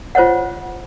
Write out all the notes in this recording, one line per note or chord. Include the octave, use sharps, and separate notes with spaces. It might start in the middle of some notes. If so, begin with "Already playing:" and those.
F4 C5 C#5 D#5 F#5